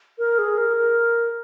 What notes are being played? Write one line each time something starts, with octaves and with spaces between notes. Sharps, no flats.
A#4
G#4
A#4